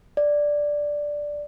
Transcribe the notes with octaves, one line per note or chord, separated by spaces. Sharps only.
D5